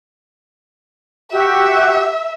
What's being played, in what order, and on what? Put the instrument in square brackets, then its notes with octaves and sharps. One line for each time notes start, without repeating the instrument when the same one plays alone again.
[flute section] F#4 G4 [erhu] E5